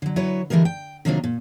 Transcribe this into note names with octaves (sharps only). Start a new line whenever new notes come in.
D3 F#3
F#3 E4 B4 C#5
D3 E3 G3 G#3 A#4
G5
C3 D#3 F#3 A#3 D4 F4
A#2